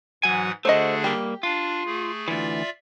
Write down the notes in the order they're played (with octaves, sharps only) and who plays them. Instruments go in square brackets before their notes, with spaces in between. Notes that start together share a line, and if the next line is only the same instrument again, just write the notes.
[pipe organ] G#2 E3 F#5 [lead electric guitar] F#3 G#5
[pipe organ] D3 D4 G#4 [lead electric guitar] A3 F#4 [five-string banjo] C5 D#5
[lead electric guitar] G3 A#3 [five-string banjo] G4
[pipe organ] D4 [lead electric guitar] F4
[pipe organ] A3 G#4
[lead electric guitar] D2 E3 [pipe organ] F4 D5 E5